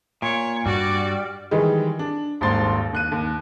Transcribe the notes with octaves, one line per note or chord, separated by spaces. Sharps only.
A#2 C#5
G2 G3 F#4 D5
D#3 E3 G3 G#3
D4
D#1 G#1 D#2 C5 C6 A6
D#2 F#6 D#7
D#2